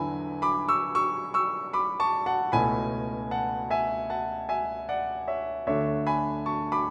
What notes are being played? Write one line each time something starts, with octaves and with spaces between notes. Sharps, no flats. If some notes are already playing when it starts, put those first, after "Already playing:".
Already playing: E2 D3 F#3 B3 E4 G#5 B5
B5 D6
C#6 E6
C#6 E6
C#6 E6
B5 D6
A5 C#6
F#5 A5
C#2 B2 A3 C#4 E4 G#5 B5
F#5 A5
E5 G#5
F#5 A5
E5 G#5
D5 F#5
C#5 E5
D2 D3 A3 D4 C#5 E5
G#5 B5
A5 C#6
B5 D6